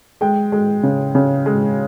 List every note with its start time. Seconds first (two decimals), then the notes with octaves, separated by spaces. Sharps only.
0.21 G#3 G5
0.52 G#3
0.83 C#3
1.15 C#3
1.46 G#3